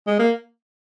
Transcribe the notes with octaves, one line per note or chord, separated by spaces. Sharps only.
G#3
A#3